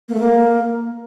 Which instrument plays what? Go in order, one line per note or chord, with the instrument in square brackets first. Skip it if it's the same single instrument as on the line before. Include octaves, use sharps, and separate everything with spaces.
[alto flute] A#3
A3
A#3